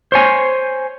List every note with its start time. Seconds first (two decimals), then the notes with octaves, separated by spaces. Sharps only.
0.12 C5 C#5 G#5